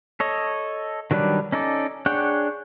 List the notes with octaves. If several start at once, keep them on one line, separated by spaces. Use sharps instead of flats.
A4 C#5 D#5
D#3 F#3 G3 D4 B4
C#4 D#4 A4 D5
D4 G#4 C#5 F#5 G5